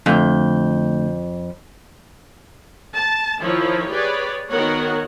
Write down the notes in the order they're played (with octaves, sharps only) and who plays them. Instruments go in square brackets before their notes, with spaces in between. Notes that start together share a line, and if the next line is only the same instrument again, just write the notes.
[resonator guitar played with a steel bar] F2 [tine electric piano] D3 A3 G6
[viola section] A5
D#3 F3 E4 C#5
G4 G#4 B4 C#5 D5
D#3 B3 F#4 A#4 C#5 F#5